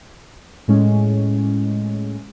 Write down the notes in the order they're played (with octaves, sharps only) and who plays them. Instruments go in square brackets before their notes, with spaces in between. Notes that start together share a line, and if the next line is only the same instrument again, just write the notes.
[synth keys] A2 G#3 C#4